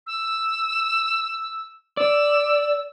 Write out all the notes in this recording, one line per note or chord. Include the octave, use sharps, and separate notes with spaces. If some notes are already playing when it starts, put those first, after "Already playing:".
E6
D5 E6